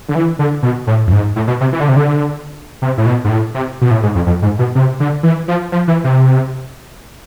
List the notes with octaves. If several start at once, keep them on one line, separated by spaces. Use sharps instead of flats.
D3
E3
D3
B2
A2
F2
G#2
A2
B2
C3
E3
D3
C3
D3
C3
A2
B2
G#2
A2
C3
B2
A2
G#2
F2
F2
G#2
B2
C3
D3
E3
F3
F3
E3
C3